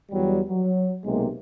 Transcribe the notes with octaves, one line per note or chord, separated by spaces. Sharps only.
E2 F#3 G3
F#3
B1 C3 G#3 A#3